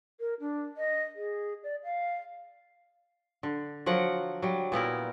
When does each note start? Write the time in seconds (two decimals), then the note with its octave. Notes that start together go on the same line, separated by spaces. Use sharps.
0.20 A#4
0.40 D4
0.77 D#5
1.16 G#4
1.63 D5
1.84 F5
3.43 D3
3.86 F3 F#3 A#4 F#5
4.42 F#3 G3
4.72 A#2 B3 E4 A#4